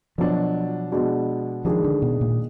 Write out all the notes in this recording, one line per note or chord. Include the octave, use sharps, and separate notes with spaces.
B2 F3 F#3 D4
B2 G#3 B3 D4 F#4
D#3 F3 G#3 D4 G#4
D3
B2
A#2